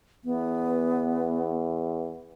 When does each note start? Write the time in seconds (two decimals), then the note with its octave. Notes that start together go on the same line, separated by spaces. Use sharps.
0.25 E2 B3